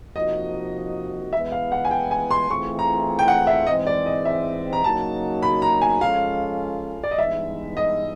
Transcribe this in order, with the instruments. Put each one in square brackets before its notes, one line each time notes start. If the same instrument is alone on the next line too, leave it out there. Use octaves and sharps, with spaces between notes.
[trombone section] C3 F3 A#3 D#4 F#4 [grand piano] D#5
[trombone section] E3 G#3 B3 [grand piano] E5
[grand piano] F5
F#5
G#5
G5
G#5
C6
[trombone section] E3 A3 C4 F4 G#4 [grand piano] C#6
[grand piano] A#5
G5
F#5
E5
[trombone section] G#2 E3 G#3 C4 [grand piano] D#5
[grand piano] D5
D#5
E5
A#5
[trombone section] C#3 F#3 A#3 D#4 F#4 [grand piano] A5
[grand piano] B5
A#5
G#5
[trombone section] F3 G#3 C#4 F4 A4 [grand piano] F5
[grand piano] D5
D#5
[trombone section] G2 E3 G#3 B3 D#4 [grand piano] E5
[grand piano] D#5